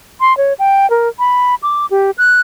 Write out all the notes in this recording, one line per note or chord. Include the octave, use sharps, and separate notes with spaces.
C6
C#5
G5
A#4
B5
D6
G4
F#6